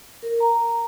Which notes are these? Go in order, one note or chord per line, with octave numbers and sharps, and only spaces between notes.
A#4
A#5